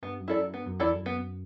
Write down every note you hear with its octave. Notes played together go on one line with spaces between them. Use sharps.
G2 B3
F#2
E4 A4 D5
F#2
G2 B3
F#2
E2 E4 A4 D5
F#2
B3